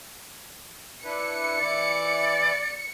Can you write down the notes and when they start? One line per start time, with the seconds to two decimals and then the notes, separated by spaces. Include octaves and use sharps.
1.04 D4 E4 B4 C#7
1.60 E3 E4 D5